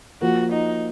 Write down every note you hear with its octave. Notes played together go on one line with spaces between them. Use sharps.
F3 A#3 F4 F#4
D#4